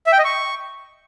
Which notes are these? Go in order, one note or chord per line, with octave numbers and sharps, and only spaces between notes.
E5
G5
D#5
C#6